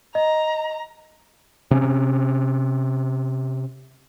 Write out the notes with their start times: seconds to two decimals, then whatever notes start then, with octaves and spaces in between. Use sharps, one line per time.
0.15 D#5 A#5
1.71 C3 C#4